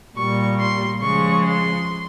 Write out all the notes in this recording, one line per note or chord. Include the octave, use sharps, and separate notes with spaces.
A#2 G3 C#6
C6
C#3 F3 G#3 C#6
C6